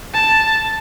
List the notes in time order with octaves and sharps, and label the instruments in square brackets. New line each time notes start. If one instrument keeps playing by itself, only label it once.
[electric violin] A5